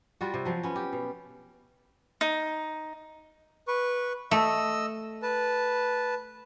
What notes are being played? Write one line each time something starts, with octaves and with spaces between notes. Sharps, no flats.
G3 F4 F#4
C3
F3 F#3
B3 C#4
G4
B2
D#4
B4 C#6
A3 D#5 E6
B4 A5